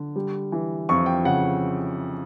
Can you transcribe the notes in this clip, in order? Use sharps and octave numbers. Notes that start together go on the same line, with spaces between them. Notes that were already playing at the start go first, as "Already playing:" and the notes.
Already playing: D3
G3
E3
F2 C#6
G5
C#3 F#5